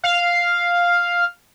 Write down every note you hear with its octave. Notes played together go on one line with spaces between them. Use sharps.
F5